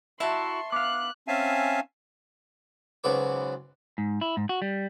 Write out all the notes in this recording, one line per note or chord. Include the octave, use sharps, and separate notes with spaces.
E4 F#4 E5 A5 C6 C#6
B3 F5 D6 F#6
C4 C#4 E5 F5 G#5 A5
B1 G#2 C#3 F#4 B4 D6
G#2
E4
G#2
F#4
G3